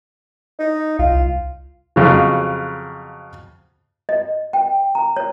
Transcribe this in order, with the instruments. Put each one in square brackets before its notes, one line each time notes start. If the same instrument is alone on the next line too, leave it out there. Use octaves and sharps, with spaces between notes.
[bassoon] D#4
[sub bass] C2 [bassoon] F4
[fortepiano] F2 C#3 F#3
[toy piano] D#5
G5
A#5
C#5